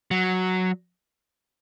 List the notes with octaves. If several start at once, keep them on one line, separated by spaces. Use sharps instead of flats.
F#3